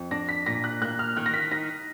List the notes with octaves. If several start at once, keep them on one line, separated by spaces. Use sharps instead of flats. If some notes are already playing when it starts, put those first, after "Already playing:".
Already playing: F2
D4 A#6
B6
A#2 A#6
F#6
A#3 F#6
F6
D#3 F#6
A#6
B6
D#4 A#6